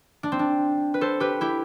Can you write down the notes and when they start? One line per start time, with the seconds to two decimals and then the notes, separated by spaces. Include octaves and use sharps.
0.23 D4
0.32 C4
0.39 D4
0.94 B4
1.01 A4 C5
1.20 G4 B4
1.41 E4 G4